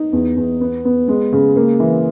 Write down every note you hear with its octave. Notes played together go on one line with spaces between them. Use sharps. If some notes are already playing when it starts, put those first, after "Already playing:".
Already playing: D#4
E2
E2
B3
B3
G#3
C#3
A#3
E3